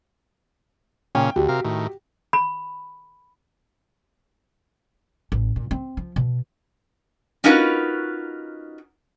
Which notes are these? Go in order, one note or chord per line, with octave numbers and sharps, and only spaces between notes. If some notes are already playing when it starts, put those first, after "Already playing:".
A#2 C#3 C#4 G5
D2 F#4 G4
C3 A#4 F5
A2 D#3
B5
A1
A#2
C4
F3
B2
C#4 D#4 F4 F#4 A#4 B4